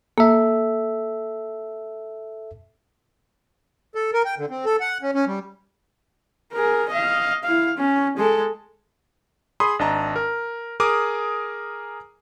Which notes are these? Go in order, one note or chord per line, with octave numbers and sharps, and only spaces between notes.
A#3 A4 E5
A4
A#4
G5
D3
C4
A4
F#5
C#4
C#4
G3
G#4 A#4
D#5 F5
E4 F5
C#4
G#3 A4
G#4 B5 C6 D#6
G#1 D4 D#5 A5 A#5
A#4
G#4 A#4 G#5 D6 D#6